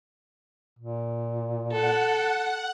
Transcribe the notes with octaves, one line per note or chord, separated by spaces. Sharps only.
A#2
A4 F#5